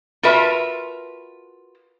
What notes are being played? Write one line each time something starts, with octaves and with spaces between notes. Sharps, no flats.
F4 F#4 A#4 B4 E5 A5